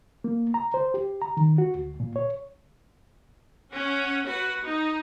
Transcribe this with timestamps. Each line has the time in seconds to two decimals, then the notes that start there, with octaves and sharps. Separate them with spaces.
0.24 A#3
0.54 A#5
0.74 C5
0.94 G4
1.22 A#5
1.37 D#3
1.58 F#4
1.75 D2
2.00 A#2
2.16 C#5
3.70 C#4 F#5
4.26 F#4 B4 F#5
4.63 D#4